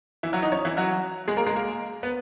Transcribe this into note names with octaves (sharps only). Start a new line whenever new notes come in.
E3 E4
F#3 F#4
D#4 D#5
C#4 C#5
E3 E4
F#3 F#4
G#3 G#4
A#3 A#4
G#3 G#4
A#3 A#4
B3 B4